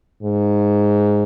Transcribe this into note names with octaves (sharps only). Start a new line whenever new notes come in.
G#2